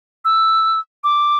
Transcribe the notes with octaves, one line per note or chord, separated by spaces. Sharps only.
E6
D6